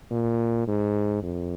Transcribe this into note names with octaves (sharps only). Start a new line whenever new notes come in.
A#2
G#2
F2